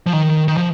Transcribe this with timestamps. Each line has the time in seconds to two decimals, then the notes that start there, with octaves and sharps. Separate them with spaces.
0.07 F3
0.13 D#3
0.48 D#3
0.57 F3